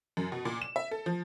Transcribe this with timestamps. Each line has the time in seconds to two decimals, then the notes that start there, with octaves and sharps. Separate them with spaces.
0.17 F#2
0.32 B2
0.45 A#2
0.62 E7
0.76 E5
0.91 A4
1.06 F3